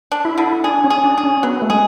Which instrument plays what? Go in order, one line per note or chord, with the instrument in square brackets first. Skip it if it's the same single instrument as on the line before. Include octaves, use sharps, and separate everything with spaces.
[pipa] D4
[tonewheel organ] E4
[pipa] D3
[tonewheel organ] D4 [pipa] G#4
[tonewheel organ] C#4
[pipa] G#4
[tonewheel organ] D4
[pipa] G#4
[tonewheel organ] C#4
[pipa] F#3 [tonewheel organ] B3
[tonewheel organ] A3
[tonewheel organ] G#3 [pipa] G#4